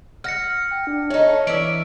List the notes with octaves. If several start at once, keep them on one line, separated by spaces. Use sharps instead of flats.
F#5 F6 A#6 C#7
G5
D4
A3 D#4 C#5
E3 C#4 D5 E5 D7